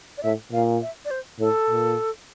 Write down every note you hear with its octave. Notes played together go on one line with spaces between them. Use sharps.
D5
A2 E5
A#2 F5
E5
D5
C5
A2 A4
A#2